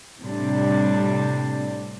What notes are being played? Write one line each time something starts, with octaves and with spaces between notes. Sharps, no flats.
A2 C3 G3 D4